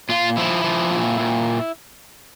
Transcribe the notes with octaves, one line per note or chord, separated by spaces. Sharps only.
A#2 F4
F3 E4
F3
A#2
A#2